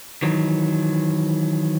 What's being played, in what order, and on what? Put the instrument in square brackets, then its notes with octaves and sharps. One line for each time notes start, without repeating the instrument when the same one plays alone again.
[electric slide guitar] D#3 E3 F#3